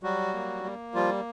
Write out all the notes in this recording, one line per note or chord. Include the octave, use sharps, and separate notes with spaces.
F#3 G3 F#4
A#3
A#3
F3 G3 F4